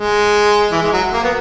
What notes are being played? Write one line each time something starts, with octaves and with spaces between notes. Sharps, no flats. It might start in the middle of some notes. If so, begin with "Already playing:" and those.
Already playing: G#3
E3
G#3
F#3
A#3
B3